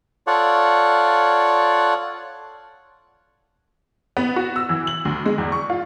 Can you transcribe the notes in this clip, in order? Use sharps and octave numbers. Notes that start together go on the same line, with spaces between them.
F4 A4 C#5 D5 F#5
B3
F#4
E6
E3
F#7
D2
G#3
E2
C#6
F4